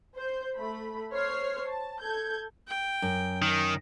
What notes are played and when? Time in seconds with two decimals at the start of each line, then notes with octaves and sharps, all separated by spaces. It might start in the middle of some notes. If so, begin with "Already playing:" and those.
0.16 C5 G6
0.56 A3 B5
1.13 C5 C#5 F6 C7
1.68 A5
2.01 A4 G6 G#6
2.68 G5
3.02 F#2
3.42 D#3